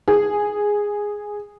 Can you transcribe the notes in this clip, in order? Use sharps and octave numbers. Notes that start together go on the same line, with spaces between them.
G#4